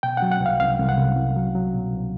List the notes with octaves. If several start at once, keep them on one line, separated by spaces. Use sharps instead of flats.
B2 G5
F#3 F#5
F#5
C2
F5
C2 F5
C2
F#5
C2
C2
F#3
F#3
B2
C2